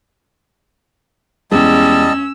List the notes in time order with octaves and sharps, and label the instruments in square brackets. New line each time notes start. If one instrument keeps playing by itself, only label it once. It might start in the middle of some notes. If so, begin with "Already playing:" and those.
[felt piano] E2 G#3 [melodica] G3 D#5 A5 [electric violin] C#4 [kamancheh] E6